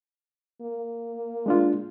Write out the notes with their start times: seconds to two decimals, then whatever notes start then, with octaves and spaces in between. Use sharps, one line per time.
0.62 A#3
1.46 G#3 D4 F4